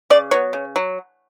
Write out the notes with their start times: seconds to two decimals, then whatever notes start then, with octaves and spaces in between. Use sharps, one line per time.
0.10 C#3 D5
0.31 F#3 B3 C#5
0.53 C#3
0.76 F#3